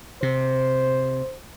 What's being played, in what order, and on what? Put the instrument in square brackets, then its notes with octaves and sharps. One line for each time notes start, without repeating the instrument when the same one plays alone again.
[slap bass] C3 [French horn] C5